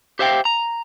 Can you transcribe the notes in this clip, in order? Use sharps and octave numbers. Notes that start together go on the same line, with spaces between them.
G4 C5 E5 F5 G5
A#5